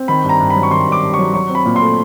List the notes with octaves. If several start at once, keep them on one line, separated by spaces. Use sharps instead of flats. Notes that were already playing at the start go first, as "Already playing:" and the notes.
Already playing: C4
D#3 B5
G2
A#5
G2
B5
F#3
C#6
D#3 C6
G2 D6
G2
F#3 C#6
F#3 C#6
C4
B5
A#2
C6
A3